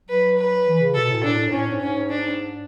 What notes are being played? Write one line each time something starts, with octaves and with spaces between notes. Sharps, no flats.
F#3 B4
B4
E3
C#3
B2 A4
A2
A2 D4
G#2
A2 C#4
G#2
G#2 C#4
D4